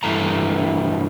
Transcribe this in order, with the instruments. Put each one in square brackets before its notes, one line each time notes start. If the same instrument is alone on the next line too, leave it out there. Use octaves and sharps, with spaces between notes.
[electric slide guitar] G2 E3 A3 A#5